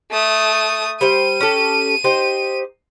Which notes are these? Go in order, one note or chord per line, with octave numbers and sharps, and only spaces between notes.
A3 D#6
G3 C5 G5 D#7
C#4 G4 A4
D#4 G4 C5